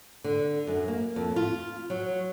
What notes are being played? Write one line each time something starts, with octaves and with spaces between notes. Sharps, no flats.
D3
F#2
A#3
F2
F4
F#3